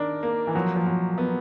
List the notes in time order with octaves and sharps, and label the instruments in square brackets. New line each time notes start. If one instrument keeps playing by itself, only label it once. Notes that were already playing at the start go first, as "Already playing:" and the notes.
Already playing: [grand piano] D#3 [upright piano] D4 A#4
[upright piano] A#3
[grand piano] E3
[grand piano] F3 [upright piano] F#3
[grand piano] F3
[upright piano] F#3
B3